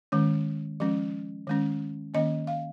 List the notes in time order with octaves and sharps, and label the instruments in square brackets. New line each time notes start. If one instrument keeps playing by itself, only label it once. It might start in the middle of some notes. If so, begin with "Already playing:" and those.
[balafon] D#3 G#3 C#4
F3 G#3 C#4
D#3 G#3 C#4
D#3 A#3 C#4 D#5
F5